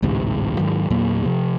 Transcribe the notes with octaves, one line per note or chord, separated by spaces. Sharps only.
A1 D2 G#2 C3
G#2 D#3 F#3
E2 A#2 F#3 A#3
C3 F3